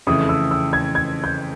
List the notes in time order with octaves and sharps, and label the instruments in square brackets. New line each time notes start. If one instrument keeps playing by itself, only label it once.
[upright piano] F2 C#3 E3 A3 [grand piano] D#6
[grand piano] E6
E6
G#6
G#6
G6